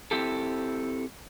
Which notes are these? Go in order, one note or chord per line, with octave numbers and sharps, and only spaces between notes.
C4 E4 G4 A4